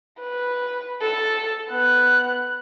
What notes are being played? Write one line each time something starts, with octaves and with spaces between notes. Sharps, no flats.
B4
A4
B3 F#6